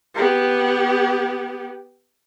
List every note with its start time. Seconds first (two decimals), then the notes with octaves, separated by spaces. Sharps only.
0.15 B3 G4